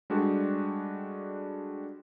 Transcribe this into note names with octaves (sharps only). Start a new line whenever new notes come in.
G3 G#3 D4 F#4 G4 A4